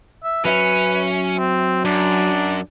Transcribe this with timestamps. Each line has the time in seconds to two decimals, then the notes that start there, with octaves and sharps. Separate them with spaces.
0.24 E5
0.45 F#3 C#4 B4 E5
1.38 C4
1.85 F#2 D4